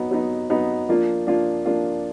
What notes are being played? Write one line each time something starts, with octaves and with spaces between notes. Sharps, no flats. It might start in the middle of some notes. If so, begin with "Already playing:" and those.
Already playing: F#3 B3 D#4
F#3 B3 D#4
F#3 B3 D#4
F3 A#3 D4 F4
F3 A#3 D4 F4
F3 A#3 D4 F4